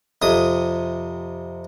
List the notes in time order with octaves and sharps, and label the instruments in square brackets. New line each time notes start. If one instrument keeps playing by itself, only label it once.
[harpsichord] F2 C3 D#6